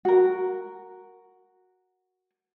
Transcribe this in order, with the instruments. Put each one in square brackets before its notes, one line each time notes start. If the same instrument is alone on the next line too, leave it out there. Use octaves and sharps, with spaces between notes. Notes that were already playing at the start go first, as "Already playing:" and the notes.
[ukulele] F#4 A#4